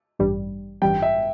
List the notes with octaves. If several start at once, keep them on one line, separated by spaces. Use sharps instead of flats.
A1 G2 G3
A1 G2 G3 G5
E5